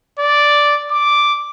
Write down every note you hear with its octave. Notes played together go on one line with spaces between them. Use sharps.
D5
D6